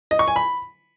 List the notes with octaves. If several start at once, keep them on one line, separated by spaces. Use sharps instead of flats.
D#5
C#6
G#5
B5